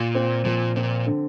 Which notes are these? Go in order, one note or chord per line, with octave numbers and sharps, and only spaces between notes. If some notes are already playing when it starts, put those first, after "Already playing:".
Already playing: A#2 F4
C4
A#2 F3
A#2 C4
D3